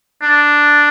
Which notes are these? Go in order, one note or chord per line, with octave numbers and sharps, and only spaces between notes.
D4